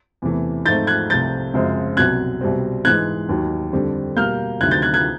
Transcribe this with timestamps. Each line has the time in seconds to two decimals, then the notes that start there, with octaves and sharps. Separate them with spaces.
0.22 E2 C3 E3 A3
0.65 G#2 F3 A3 C4 G6 A6
0.87 F#6 G#6
1.10 C2 C3 F3 A3 C4 G6 A6
1.54 F#2 C#3 F3 G#3 C4
1.97 C2 B2 F#3 F#6 G#6
2.41 C2 B2 G3 C4
2.85 G#2 E3 G#3 F#6 G#6
3.29 D#2 D#3 F#3
3.73 F2 D3 G3 C4
4.16 B2 G3 A#3 F6 G6
4.61 D2 C3 D#3 F#3 F#6 G#6
4.71 G6 A6
4.82 F#6 G#6
4.94 F#6 G#6